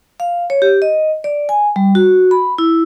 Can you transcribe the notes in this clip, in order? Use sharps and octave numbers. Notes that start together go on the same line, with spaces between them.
F5
C#5
G4
D#5
D5
G#5
G3
F#4
B5
E4